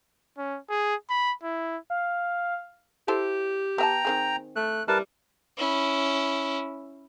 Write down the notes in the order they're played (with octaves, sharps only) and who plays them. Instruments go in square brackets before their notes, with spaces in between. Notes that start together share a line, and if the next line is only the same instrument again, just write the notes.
[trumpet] C#4
G#4
B5
E4
[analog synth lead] F5
[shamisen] E4 A4 C5 [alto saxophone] G4
[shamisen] B3 E5 A5 [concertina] G5 A#5
[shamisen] D#3 C4 G#4
[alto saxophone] A3 [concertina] F#6
[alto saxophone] G3 [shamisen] E4 [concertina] A#4 B4 A5
[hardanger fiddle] C#4 E4